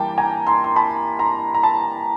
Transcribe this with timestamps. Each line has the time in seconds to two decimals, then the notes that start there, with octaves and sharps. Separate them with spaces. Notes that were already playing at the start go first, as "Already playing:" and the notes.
Already playing: E3 G3 A#3 G5 A5
0.18 G#5 A#5
0.47 A#5 C6
0.64 C6
0.76 A5 B5
1.19 A#5 C6
1.55 A#5
1.63 A5 B5